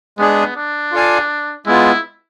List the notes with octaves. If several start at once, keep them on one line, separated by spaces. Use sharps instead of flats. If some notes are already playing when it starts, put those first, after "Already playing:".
G#3 B3 D4 G#4
D4
F4 A4 D5 F5 G#5
G#3 B3 E4 F4